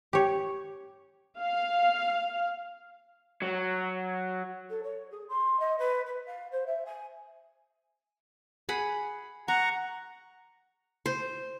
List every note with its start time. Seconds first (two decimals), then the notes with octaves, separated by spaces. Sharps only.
0.13 G4 C#5
1.40 F5
3.42 F#3
4.69 A4
4.83 C#5
5.11 G#4
5.29 C6
5.59 D#5
5.78 B4
6.06 B4
6.26 F5
6.51 C5
6.66 E5
6.85 G#5
8.69 G#4 F#5 B5
9.48 F#5 A#5 C#6
11.06 C5